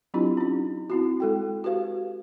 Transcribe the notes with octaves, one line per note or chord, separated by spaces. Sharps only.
F#3 C4 D4 E4 F4 G4
C#4 D#4
C4 E4 F#4
G#3 A4 G5
F#4 G4 B4 F5